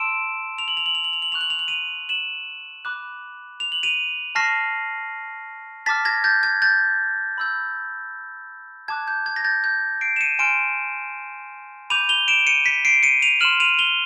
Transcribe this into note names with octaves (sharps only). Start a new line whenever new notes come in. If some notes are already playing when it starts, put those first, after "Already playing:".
Already playing: A5 C6 E6 D7 E7
F7
F#7
F7
F#7
F7
F#7
F7
F#7
C#6 F#6 F7
F#7
F7
F#7
D#7 F7
E7 F#7
B5 D6 F#6
F7
F#7
D#7 F7
A5 C#6 F6 A#6 C7
A5 D6 F6 A6 B6
G#6 A#6
G6 A6
G#6
G6 A6
B5 E6 G6
A5 D6 F#6 G#6
G6
G#6
A#6
G6 A6
G6
C7 D7
E7
C#7 D#7
G#5 C6 F6 D7 E7
B5 D6 G6 D#7 F7
F7 G7
D7 E7
C#7 D#7
B6 C#7
C7 D7
C#7 D#7
D#7 F7
C6 F6 E7 F#7
D#7 F7
F7 G7